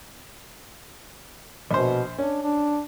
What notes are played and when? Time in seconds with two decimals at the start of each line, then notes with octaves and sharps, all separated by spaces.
1.71 A#1 B2 C5
2.18 C#4 D4
2.43 D4